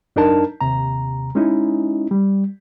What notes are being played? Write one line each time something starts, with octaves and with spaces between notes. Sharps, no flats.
F#2 D4 D#4 A#4 A5
D#2 C3 A#5
G#3 C#4 D#4 E4
G3